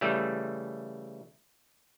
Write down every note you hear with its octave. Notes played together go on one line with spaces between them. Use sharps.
C#3 E3 G3 A3